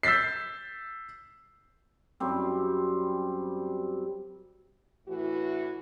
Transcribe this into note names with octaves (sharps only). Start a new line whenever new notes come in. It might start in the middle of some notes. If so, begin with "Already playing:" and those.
E6 G6 A6 B6 C7
F#2 G3 C4
A2 E3 F#4